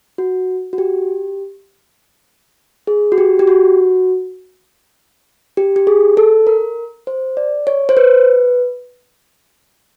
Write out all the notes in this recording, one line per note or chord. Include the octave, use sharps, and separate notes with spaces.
F#4
F#4
G4
G#4
F#4
G4
G4
F#4
G4
G4
G#4
A4
A#4
C5
D5
C#5
C5
B4